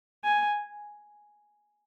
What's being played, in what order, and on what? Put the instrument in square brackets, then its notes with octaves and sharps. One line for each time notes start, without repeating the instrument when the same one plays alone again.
[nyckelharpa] G#5